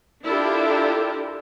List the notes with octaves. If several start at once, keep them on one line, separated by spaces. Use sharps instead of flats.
D4 E4 F4 G4 A4 A#4